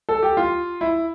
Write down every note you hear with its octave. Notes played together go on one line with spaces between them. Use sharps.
A4
G4
F4
E4